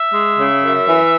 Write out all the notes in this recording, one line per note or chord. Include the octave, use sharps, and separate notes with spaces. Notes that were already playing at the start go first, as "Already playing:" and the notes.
Already playing: E5
G#3
C#3
F#2
E3